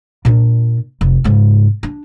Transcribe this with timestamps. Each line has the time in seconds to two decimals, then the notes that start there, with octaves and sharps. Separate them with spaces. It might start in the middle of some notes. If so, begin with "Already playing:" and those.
0.25 A#2 D4
1.01 F1
1.24 G#2 C#3
1.83 D4